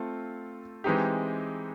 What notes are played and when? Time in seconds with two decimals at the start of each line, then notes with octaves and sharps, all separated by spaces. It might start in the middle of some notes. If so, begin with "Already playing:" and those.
Already playing: A3 C4 F4 A4
0.84 E3 G#3 C4 D#4 G4